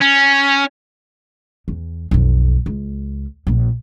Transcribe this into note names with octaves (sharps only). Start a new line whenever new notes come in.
C#4
E2
B1 F2
C#2
A#1 A#3